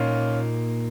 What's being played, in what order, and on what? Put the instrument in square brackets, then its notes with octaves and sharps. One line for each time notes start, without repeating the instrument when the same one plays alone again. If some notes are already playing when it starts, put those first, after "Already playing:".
Already playing: [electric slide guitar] A#2 A#3 D#4 [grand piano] C#4 F4